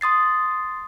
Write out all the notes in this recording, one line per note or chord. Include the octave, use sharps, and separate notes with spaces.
C6 D#6 A6 C7